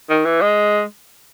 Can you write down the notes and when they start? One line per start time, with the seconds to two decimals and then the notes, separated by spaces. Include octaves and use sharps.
0.09 D#3
0.25 E3
0.41 G#3